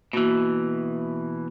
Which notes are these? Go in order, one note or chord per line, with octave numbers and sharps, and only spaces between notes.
B2 E3 A#3 F#4